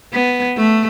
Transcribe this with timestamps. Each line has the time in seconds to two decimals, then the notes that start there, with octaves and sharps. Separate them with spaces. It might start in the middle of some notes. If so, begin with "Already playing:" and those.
0.13 B3
0.57 A3